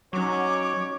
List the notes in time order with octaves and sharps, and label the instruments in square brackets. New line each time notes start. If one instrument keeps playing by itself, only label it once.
[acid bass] F#3 [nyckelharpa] C#4 D#4 [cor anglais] C#5 [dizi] D6